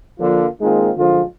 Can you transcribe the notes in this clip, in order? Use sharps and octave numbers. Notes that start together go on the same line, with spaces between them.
D3 F3 A#3 D4 F4
D#3 G#3 A#3 C4 D#4 F4
F#2 D3 F3 G#3 F4